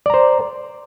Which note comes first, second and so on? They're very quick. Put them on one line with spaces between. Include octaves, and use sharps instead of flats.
D5 A#5 C5